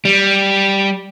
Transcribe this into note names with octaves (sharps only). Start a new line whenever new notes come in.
G3